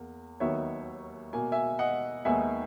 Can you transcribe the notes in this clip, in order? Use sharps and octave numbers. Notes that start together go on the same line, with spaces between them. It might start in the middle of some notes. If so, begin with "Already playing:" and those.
Already playing: E2 A#3
D#2 D#3 F#3 B3 C#5 E5
B2 A#3 G#5
E5 G#5
D#5 F#5
D#2 D#3 G#3 B3 E5 G#5